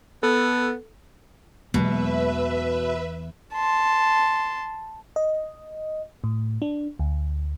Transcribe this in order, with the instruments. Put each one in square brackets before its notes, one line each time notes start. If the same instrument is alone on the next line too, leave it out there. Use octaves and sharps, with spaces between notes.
[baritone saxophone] B3 [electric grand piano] A4
[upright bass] E2 [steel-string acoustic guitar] B2 [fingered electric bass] F#3 G#3 A#3 [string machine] B4 E5
[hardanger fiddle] A5 C6
[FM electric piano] D#5
A2
D4
D2